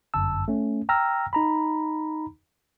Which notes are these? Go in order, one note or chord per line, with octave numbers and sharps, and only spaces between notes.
G1 F#2 A5 E6
A3 C#4
G5 A#5 E6 F6 A#6
D#4 A#5 B5